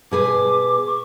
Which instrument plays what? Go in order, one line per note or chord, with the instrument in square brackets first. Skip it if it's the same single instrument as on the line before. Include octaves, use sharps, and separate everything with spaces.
[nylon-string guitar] B2 G#4 B4 [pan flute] D6
[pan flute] C#6